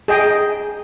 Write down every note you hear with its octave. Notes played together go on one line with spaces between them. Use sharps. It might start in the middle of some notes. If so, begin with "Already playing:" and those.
G#4 D#5 G5